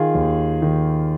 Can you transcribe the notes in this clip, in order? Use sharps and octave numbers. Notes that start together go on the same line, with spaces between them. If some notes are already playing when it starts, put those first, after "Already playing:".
Already playing: D#3 F4 G#4
D#2
D#3